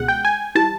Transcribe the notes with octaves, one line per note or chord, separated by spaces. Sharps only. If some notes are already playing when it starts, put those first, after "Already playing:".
Already playing: C#2 B2 G#3 F#5
G5
G#5
E3 G3 A5